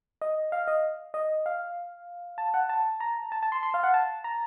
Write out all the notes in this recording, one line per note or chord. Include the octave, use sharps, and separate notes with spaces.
D#5
F5
D#5
D#5
F5
A5
F#5
A5
A#5
A5
A5
C6
C6
F5
F#5
A5
A#5